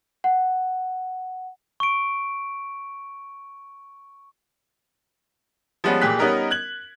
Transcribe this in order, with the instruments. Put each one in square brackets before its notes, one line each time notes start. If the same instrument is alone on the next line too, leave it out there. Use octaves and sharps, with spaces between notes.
[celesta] F#5
[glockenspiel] C#6 D7
[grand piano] F3 G3 G#3 B3 C#4
A#2 E3 G4 G#4 F#6 B6
G3 B3 C#4 D#4 A#4 D#5
F#6 G#6 F#7